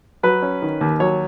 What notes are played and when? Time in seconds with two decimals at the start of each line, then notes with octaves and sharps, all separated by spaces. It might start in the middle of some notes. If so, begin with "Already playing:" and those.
0.23 F#3 B4
0.42 C#4
0.62 D#3
0.81 D#2
1.00 F#3 C#5